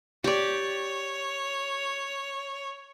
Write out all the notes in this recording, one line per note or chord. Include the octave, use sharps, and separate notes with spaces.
G4 C#5 D5